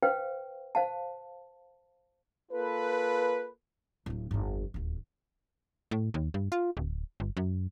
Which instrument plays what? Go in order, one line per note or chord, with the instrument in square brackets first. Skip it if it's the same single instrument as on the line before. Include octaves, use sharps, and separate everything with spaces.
[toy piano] B4 C5 F5 G5
C5 F5 A5
[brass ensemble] A#3 F4 A4 B4
[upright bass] D1 C4
G1 F2
D1 D#2
[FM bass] A2
D#2
G2
F4
D1
G1
F#2